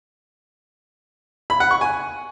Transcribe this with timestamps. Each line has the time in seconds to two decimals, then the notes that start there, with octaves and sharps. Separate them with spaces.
1.50 B5
1.60 F#5
1.71 C#6
1.81 G#5